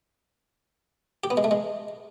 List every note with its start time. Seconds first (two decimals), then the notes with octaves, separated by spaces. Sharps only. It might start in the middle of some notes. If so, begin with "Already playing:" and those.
1.24 G4
1.30 B3
1.37 G#3
1.44 A3
1.51 G#3